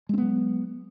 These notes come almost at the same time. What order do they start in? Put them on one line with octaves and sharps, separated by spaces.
G#3 C4 B3 F#3